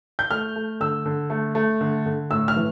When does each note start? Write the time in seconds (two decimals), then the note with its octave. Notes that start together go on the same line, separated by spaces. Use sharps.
0.19 G6
0.31 A3 F6
0.56 A3
0.80 D3 E6
1.06 D3
1.30 A3
1.55 A3
1.81 D3
2.06 D3
2.30 A2 E6
2.48 F6
2.56 E3